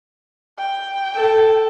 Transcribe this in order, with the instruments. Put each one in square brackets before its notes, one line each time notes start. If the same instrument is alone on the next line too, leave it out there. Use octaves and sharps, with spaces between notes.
[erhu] G5
[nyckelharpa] A4